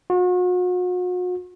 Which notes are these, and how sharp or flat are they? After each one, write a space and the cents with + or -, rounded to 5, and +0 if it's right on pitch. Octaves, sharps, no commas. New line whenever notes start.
F#4 -40